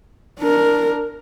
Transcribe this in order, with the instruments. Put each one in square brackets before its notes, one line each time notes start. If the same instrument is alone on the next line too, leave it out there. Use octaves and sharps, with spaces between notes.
[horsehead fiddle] D4 A#4